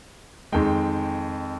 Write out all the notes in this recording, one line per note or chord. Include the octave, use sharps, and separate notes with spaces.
F2 D#3 G#3 G5